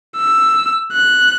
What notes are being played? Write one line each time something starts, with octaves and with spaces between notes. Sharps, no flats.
E6
F#6